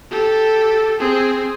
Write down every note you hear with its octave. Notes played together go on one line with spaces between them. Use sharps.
G4 A4
C4 G#4